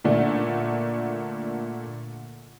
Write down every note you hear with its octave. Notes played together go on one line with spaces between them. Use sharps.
A#2 D3 A3 D4